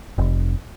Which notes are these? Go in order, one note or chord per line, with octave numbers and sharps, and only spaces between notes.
F1